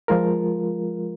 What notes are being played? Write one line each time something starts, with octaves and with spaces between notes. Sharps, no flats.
F3 G#3 F4 A#4